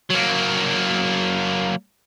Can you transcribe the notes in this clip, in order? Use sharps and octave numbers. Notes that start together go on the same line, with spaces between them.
F#3 A#3